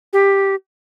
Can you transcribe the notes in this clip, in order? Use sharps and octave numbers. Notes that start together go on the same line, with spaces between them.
G4